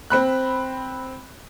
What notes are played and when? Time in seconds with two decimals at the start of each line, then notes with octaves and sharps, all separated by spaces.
0.10 C4 B5 F#6